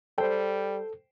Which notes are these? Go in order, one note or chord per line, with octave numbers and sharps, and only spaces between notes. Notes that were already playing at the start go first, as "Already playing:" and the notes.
G3 A4 C5 G5